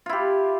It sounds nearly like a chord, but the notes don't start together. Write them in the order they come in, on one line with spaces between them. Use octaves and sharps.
F4 E4 G4